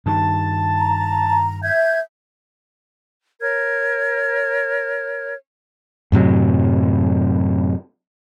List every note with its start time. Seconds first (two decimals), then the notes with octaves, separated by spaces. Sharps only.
0.06 G2 D#3 A5
0.77 A#5
1.63 E5 G6 G#6
3.41 A#4 C#5 F6 G#6
6.12 F#2 A2 C3 F#3